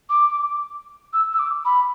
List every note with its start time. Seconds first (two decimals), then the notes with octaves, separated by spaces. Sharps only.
0.10 D6
1.13 E6
1.33 E6
1.39 D6
1.65 B5